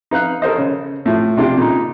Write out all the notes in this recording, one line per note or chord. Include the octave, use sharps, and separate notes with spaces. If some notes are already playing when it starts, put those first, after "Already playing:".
D#4 B4 F5 F#6
A4 A#4 C5 D#5
C#3 C#5
A2 F3
C3 D4 F4 G4
A#2 C#3 D#4